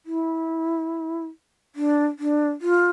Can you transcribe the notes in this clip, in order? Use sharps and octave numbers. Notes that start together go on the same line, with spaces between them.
E4
D4
D4
F4